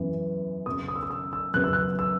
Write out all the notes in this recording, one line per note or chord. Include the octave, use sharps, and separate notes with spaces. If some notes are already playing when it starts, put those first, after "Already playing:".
Already playing: F#2 E3 B3
F#2 C#3 F#3 B3 D#6
D#6
E6
D#6
E6
E6
F#2 C#3 F#3 B3 F#6
E6
F#6
E6